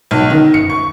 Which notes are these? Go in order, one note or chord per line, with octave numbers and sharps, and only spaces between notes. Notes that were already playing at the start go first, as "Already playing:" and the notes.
B1
D#3
C#7
C#6